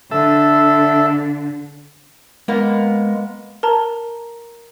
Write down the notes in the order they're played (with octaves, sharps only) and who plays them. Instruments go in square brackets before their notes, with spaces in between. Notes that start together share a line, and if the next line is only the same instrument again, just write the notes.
[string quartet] D3 [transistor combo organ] A4 E5
[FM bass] G#3 [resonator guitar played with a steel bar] A#3 B3
[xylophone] A#4 A5 A#5